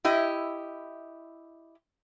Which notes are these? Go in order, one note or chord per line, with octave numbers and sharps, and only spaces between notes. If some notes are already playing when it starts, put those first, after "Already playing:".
E4 G4 D#5